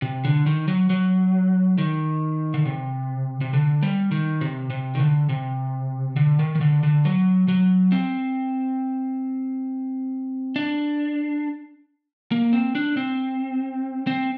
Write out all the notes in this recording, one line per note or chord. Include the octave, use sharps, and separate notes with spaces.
C3
D3
D#3
F#3
F#3
D#3
D3
C3
C3
D3
G3
D#3
C3
C3
D#3
D3
C3
D3
D#3
D#3
D3
D3
F#3
F#3
C4
D4
A#3
C4
D4
C4
C4